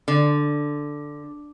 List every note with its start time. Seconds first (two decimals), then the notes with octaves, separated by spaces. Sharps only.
0.08 D3